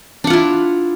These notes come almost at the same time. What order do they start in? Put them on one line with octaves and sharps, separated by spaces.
D4 F#5 F4 E4